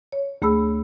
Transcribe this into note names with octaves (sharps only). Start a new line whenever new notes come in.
C#5
D2 A3 G#4 B5 E6